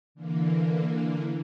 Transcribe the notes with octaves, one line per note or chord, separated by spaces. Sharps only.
D3 E3 A#3